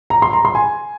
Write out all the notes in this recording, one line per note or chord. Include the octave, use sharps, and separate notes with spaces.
A#5
C6
A#5
C6
G#5